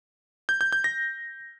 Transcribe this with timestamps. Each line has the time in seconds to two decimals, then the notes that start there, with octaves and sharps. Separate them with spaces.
0.49 G6
0.61 G6
0.72 G6
0.84 A#6